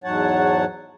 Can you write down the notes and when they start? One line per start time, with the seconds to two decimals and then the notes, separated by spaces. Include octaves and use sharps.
0.04 E2 G#2 F#3 C#5 F#5 A5